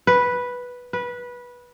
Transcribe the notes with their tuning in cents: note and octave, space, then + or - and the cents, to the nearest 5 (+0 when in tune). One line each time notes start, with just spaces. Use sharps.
B4 -5
B4 -15